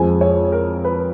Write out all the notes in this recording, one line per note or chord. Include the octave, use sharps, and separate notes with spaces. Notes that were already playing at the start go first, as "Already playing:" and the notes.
Already playing: F2 F3 G#3 G#5
C#5
A#4
B4